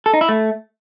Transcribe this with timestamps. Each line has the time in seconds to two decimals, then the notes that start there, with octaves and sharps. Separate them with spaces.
0.06 A4
0.13 D#4
0.21 E4
0.29 A3